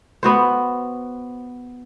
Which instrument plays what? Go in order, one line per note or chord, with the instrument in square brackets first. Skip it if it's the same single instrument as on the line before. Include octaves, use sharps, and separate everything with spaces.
[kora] B3 F#4 C5